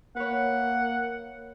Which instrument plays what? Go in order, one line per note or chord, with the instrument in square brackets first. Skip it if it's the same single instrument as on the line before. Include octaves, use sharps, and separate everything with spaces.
[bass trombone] A#3 [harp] B4 C#5 [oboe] F#5